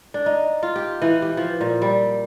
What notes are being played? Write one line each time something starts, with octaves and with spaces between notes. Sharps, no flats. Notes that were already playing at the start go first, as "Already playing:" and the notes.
D4
D#4
F4
G4
E3
G4
F3
A#2
G3